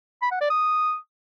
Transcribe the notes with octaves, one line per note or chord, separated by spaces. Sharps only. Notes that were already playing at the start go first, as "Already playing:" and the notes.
B5
F#5
D5
D#6